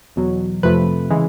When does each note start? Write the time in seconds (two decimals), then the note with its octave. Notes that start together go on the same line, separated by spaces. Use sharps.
0.16 E2 B2 F#3
0.63 F2 C3 F3 A3 B4
1.10 C#3 E3 G#3